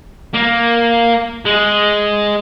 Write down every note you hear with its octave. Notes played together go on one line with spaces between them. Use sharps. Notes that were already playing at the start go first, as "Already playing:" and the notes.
A#3
G#3